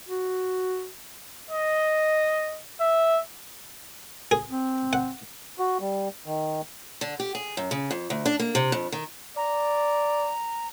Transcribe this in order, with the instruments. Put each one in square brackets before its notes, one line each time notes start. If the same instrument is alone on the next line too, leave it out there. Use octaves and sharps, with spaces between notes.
[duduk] F#4
[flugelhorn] D#5
E5
[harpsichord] G#4
[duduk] C4
[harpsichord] F#5
[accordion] F#4
G3
D#3
[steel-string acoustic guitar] D3
G4
G#4
F#2
C#3
F2
D2
D4
A#3
C3
F2
D#3
[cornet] D5 [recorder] A#5